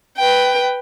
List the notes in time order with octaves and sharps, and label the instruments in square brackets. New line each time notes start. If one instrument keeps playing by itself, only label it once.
[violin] B4 G5